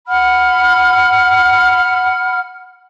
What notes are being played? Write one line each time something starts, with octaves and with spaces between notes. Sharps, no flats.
F#5 B5 F6